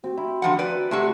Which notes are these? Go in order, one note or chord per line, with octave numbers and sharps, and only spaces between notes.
C4 F#4
E4
D3 F3 F#5 A#5
B4 D5
C3 G#3 A3 F#4 G4